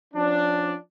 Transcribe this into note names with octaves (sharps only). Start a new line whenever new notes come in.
F3 C#4 D4